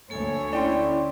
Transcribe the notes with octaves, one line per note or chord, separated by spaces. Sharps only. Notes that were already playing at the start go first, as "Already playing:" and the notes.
D2 A#3 A4 C#5 G#5
C#4 E4 D5 G5 C6